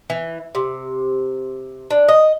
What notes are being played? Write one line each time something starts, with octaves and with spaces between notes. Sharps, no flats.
E3
C3
D4
D#5